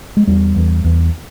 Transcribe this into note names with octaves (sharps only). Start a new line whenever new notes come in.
G#3
E2 G3
E2
E2